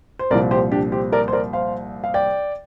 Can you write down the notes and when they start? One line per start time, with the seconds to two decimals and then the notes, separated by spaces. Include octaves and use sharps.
0.19 C5
0.31 C2 A#2 F3 A#4 D5
0.51 G4 C5
0.72 D4 G4
0.92 G4 C5
1.12 A#4 D5
1.28 C5
1.33 A#4 D5
1.53 C5 F5
2.04 F5
2.14 D5 G5